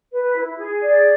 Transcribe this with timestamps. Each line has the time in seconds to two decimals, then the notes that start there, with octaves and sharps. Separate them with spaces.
0.11 B4
0.35 E4
0.58 G#4
0.81 D5